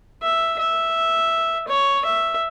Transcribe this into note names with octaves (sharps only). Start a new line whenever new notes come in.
E5
E5
C#5
E5